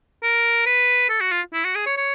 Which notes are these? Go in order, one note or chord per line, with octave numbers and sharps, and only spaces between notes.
A#4
B4
A4
F#4
F4
E4
F#4
G#4
C#5
C#5